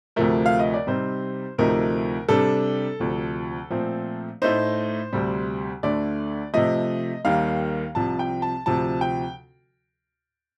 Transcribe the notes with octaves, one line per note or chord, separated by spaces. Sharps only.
D2 C3 F3 A3 A#4
F5
D#5
D5
C3 G3 C4 D#4 C5
D2 C3 F3 A3 D#4 A#4
C3 G3 D4 A4
D2 C3 F3
A#2 F3 A3 C4
A2 A3 D#4 C5
D2 C3 G3
D2 D3 A3 D4 D5
C3 F3 A3 D#5
D#2 D#3 G3 A#3 F5
C2 C3 F3 A5
G5
A5
D2 C3 F3 A5
G5